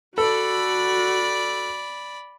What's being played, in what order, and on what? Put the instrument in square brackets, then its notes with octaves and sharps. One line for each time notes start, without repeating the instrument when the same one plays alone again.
[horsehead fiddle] F#4 [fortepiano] A4 [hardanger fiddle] D5 B5